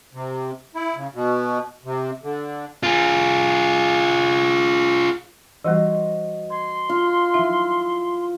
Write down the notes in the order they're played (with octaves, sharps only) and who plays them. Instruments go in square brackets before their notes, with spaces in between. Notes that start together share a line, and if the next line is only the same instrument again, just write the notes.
[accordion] C3
E4
C#3
B2
C3
D3
[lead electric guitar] F4 G#4
[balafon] E3 G3 [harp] F#4 C5 D#5
[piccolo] C6 [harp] G#6
[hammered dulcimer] F4
[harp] F3 E4 [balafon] E5